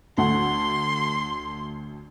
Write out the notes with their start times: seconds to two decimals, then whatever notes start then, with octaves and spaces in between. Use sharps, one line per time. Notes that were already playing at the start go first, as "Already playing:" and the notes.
0.18 D2 A3 F#5 C6